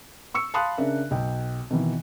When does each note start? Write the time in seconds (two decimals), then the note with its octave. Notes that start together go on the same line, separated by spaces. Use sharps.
0.34 C#6 E6 C#7
0.54 F5 A5 B5 C6 D#6 F#6
0.78 C#3 D4 A#4 E5
1.11 B1 G5
1.71 B2 D#3 E3